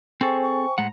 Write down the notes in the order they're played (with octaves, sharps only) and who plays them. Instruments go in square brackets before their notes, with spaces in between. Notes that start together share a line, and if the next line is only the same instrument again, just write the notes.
[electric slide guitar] C4 G#4 A4 [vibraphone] C5 G5 G#5 [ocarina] C#6
[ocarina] C#6
[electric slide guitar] A2 G#3 F#5 [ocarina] A#5